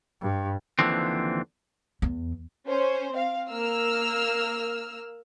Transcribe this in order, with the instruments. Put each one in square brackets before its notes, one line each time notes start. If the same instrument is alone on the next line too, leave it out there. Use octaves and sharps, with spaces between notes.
[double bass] G2
[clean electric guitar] D#2 B2 D3 E3 F3 C4
[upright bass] E2
[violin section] C#4 C5
C4 F5
A#3 E6 F6